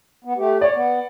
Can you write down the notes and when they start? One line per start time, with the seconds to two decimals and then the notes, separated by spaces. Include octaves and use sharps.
0.24 B3
0.37 A3 G4
0.61 C#5 D5
0.75 B3